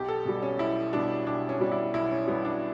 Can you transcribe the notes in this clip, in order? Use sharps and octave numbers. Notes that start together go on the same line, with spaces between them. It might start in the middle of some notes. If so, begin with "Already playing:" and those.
Already playing: B1 G4
A4
B2 G3
C#4
B1 E4
B2 G3 D4
B1 D4
C#4
B2 G3
E4
B1 E4
C#4
B2 G3 B3
D4